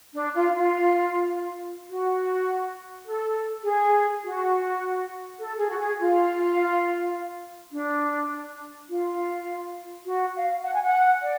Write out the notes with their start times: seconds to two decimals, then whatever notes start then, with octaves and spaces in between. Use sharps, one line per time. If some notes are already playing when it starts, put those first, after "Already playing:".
0.15 D4
0.34 F4
0.54 F4
1.89 F#4
3.06 A4
3.64 G#4
4.23 F#4
5.39 A4
5.58 G#4
5.70 F#4
5.78 G#4
5.98 F4
7.72 D4
8.89 F4
10.05 F#4
10.35 F5
10.64 F#5
10.73 G#5
10.83 F#5
11.22 D5